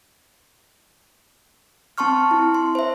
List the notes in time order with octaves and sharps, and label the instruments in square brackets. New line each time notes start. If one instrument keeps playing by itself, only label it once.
[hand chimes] C4 A5 C6 C#6 F6
E4
C6
C5 E5